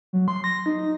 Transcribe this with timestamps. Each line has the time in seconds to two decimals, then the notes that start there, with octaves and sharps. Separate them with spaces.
0.13 F#3
0.28 C6
0.44 A#6
0.66 D#4